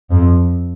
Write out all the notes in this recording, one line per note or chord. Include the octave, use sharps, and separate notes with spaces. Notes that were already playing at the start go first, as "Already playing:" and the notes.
F2